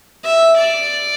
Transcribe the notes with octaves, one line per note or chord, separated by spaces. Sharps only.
E5
D5